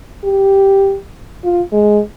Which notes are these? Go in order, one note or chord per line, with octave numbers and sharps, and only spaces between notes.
G4
F4
G#3